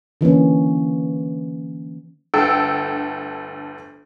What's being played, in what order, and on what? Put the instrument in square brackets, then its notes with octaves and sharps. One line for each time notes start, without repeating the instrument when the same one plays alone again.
[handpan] D3 E3 A#3 C#4
[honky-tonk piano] G1 D2 A4 G5 E6